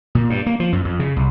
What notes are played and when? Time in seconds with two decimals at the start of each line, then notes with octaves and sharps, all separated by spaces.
0.15 A#2
0.30 G2
0.46 A#3
0.60 F3
0.72 F#2
0.85 F2
1.00 C#3
1.16 C2